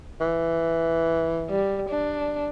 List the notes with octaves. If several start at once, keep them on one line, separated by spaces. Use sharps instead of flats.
E3
G3
D4